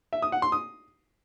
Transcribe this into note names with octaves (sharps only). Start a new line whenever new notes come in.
E5
D#6
F#5
C6
D#6